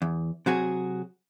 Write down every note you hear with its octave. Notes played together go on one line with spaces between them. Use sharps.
E2
C3 F#3 F#4 G#4